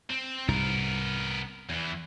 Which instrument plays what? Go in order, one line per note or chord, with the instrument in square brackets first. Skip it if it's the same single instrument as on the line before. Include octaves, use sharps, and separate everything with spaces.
[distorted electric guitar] C4
[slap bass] C2 G#2 C3 [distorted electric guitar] B3 A#4
[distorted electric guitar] E2 E3